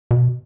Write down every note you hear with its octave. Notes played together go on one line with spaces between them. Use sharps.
B2